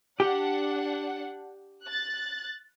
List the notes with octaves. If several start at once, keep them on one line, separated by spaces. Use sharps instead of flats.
D4 G4 F#5
F#6 A6